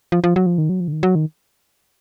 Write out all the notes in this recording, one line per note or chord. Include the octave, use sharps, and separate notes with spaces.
F3
F3
F#3
F3
D#3
F#3
F3
D3
D#3
F#3
D#3